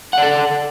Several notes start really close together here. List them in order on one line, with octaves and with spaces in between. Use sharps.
F#5 D5 A4